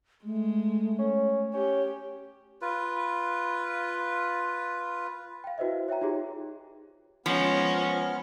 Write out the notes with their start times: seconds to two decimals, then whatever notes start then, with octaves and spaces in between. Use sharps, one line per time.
0.25 G#3 A3
0.99 C#4
1.54 C#4 G4
2.62 F4 B4
5.44 F5 G5
5.58 E4 F#4 B4 C5 D#5 E5
5.88 C#5 E5 G5 A#5
6.01 D#4 F4 G4 G#4 C#5
7.26 F3 G#3 B3 C#4 F6